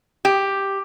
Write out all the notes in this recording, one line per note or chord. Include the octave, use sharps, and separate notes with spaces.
G4